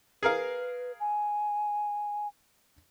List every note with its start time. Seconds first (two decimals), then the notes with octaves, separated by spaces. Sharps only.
0.23 G#4 A#4 B4 F5
1.00 G#5